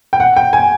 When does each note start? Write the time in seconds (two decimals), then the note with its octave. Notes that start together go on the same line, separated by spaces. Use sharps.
0.13 G5
0.20 F#5
0.37 G5
0.53 G#5